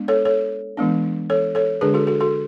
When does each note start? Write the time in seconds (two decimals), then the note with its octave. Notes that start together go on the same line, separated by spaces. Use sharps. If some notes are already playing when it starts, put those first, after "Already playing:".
Already playing: G#3 B3 D4
0.08 A4 C#5
0.25 A4 C#5
0.77 E3 G#3 B3 D4
1.30 A4 C#5
1.55 A4 C#5
1.81 D3 G#3 D4 G#4 B4
1.94 F#4 A4
2.07 F#4 A4
2.20 F#4 A4